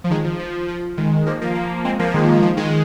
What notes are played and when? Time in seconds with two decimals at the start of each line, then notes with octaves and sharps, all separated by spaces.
0.04 F3
0.10 D#3 G#3
0.25 F3
0.40 F3
0.68 F3
0.97 D#3 G#3
1.26 F3 A#3
1.41 F3 A#3
1.55 F3 A#3
1.85 G#3 C4
1.99 F3 A#3
2.14 D#3 G#3
2.28 D#3
2.43 F3
2.57 D#3 G#3